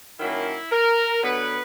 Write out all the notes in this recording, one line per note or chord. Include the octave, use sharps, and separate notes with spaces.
D#3 F#3 A#3 C#4 E4
A#4
D3 F#3 B3 B4